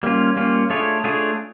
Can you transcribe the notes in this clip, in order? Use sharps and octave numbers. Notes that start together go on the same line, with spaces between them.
G3 A#3 C#4 F4
G3 A#3 C#4 F4
A3 D4 F4 G#4 C#5
A3 D4 F4 G#4 C#5